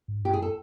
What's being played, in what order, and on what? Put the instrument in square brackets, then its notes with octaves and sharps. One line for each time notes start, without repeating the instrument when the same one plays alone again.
[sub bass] G#2
[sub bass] G2 [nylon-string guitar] G4
[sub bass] F#2 [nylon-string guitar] G#4
[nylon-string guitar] A4